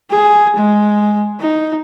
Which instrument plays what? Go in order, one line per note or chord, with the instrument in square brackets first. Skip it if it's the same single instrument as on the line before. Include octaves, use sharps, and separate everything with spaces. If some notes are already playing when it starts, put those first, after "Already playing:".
[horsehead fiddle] G#4
G#3
D#4